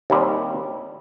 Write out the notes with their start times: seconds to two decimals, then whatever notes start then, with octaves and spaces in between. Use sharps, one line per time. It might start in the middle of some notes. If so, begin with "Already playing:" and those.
0.10 D#2 D#3 G3 C4